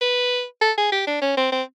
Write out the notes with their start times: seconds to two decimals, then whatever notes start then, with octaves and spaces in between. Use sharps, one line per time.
0.01 B4
0.61 A4
0.77 G#4
0.92 G4
1.07 D4
1.22 C#4
1.37 C4
1.52 C4